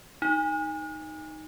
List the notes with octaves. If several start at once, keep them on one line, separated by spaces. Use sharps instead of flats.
D#4